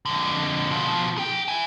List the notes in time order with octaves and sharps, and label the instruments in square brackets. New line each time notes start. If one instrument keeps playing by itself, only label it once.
[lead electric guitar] F2 D3
B2 F3
G#4 G5
E5 G#5